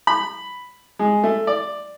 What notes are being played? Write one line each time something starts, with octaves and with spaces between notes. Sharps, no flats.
B5
G#3
A3
D5